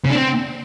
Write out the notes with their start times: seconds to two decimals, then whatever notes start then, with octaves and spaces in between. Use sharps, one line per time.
0.06 C#3
0.11 D4
0.16 C4